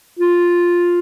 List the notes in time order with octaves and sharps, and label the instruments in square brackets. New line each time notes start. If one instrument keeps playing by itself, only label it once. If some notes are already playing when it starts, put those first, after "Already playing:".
[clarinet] F4